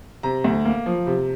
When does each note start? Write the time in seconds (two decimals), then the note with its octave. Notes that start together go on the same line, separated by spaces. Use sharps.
0.23 C3 A#5
0.44 D2
0.65 A#3
0.86 F3
1.07 C3